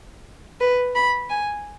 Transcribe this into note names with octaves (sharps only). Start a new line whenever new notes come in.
B4
B5
G#5